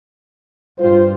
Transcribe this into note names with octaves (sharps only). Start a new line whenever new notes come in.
G2 F4 C5